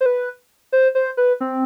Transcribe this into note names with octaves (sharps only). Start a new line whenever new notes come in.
C5
B4
C5
C5
B4
C4